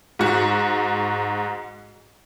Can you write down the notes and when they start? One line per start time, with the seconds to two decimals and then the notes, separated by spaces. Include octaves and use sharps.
0.19 G#2 F#4